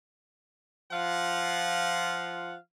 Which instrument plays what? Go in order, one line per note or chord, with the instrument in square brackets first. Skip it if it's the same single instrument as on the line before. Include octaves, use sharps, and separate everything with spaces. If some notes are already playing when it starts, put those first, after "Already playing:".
[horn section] F3 F4 F5 F#5